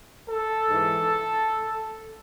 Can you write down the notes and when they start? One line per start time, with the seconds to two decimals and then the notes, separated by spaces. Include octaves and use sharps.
0.29 A4
0.70 G#2 E3